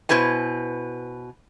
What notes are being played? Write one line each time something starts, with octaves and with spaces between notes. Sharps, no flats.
B2 E4 B4 C5 G#5